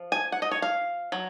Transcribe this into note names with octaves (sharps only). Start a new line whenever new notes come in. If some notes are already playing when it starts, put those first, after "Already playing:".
Already playing: F3
G#5
F#5
D#5
C#5
F5
F#3